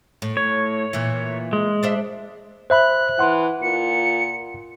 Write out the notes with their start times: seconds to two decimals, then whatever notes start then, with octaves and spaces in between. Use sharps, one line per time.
0.22 A2
0.37 C#5
0.93 A#2 E3
1.53 G#3
1.83 D4 C5 E5
2.70 C5 E5 B5 F#6
3.19 E3 F#5 C6
3.62 A#2 C#7